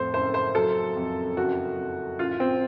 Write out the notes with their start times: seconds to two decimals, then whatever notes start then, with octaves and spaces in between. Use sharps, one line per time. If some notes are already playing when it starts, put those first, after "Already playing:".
Already playing: F2 A2 A4 C5
0.14 F#1 C5
0.34 C5
0.55 F#3 A4
0.96 F2
1.37 F#1 F#4
1.78 F2
2.19 A1 F4
2.40 C4